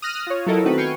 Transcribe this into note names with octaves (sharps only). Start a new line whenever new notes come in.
D#6 F6 F#6 A#6
F4 C#5
F#3 E4 A4 A#4 D#5
D#3 A3 B3 C4 F#4 B4
F5 G5 G#5 C#6